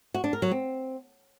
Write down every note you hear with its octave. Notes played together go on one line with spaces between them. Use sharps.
F#4
D4
A#4
F#3
C4